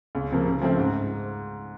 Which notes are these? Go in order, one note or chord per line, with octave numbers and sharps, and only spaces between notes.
C#2
C3 F3 A#3
C#3
F3 A3 C4
G#2